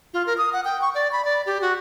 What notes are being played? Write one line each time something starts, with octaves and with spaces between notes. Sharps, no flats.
F4
A#4
D#6
F#5
G5
C#6
D5
B5
D5
G4
F#4